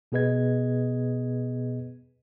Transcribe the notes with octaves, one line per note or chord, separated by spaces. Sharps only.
B2 B3 G#4 B4 D#5 G#6